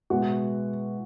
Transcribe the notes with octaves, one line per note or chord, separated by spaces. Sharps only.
B2 G#3 B3 E4 F#4